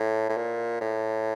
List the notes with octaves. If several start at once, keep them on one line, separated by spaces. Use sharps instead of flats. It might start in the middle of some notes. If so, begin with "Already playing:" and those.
Already playing: A2
A2
A#2
A2